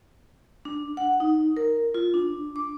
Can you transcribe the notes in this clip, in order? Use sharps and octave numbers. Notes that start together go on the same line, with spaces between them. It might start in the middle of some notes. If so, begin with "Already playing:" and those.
D4
F#5
D#4
A#4
F4
D4
D6